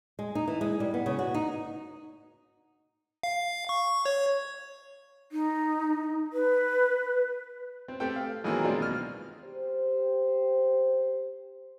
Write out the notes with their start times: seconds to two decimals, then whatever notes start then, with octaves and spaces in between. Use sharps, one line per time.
0.19 G#3
0.35 D#4
0.48 E3
0.61 G#3
0.80 G3
0.94 B3
1.06 C#3
1.19 F#4
1.34 D#4
3.23 F5
3.69 C#6
4.06 C#5
5.32 D#4
6.33 B4
7.88 C4
8.00 A3 C4 G4 A4 G5
8.16 F5
8.44 B2 D#3 E3 F#3 G#3 A#3
8.64 G#3 C4 D4 F4
8.80 B2 F6
9.44 G4 C5